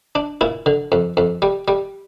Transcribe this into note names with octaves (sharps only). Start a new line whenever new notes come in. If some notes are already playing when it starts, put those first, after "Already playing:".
D4
A#2 E4
D3
F2
F2
G3
G3